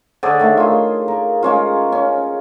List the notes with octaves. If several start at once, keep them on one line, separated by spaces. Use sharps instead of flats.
D3 G#4 C#5 D5
D#3 A3
F4 G#4
A#4
G#3 C#4 F4
C#4